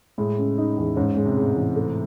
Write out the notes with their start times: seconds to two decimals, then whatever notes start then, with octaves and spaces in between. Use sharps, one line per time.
0.18 A2 G#3
0.38 C#3
0.57 D#4
0.77 E2
0.96 G#2 C#4
1.17 G#3
1.26 C3
1.36 A2 G#4
1.56 E3
1.76 A3